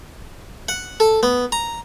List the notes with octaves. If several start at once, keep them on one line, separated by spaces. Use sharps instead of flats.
F#5
A4
B3
A#5